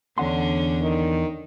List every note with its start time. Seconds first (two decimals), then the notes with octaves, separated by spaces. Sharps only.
0.18 E2 D3 C#4 D4 F#5 C6
0.82 D#3